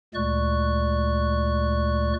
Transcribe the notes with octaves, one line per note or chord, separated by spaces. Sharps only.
D2 A#2 G#3 D5 C#6 F#6